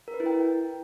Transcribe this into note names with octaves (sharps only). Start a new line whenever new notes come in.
A#4
B4
E4
G5